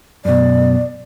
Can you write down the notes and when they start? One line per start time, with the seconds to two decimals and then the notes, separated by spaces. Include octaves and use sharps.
0.25 F#2 B2 D5